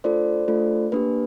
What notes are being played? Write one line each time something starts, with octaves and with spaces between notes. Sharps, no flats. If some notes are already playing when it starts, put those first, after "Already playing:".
A3 D4 F4 A4 C5 D5
A3 D4 F4 A4
A#3 D4 G4 B4